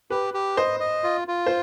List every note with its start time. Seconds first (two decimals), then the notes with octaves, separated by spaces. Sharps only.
0.10 G4 B4
0.34 G4
0.57 C5 D#5
0.80 D#5
1.04 F4
1.28 F4
1.46 C5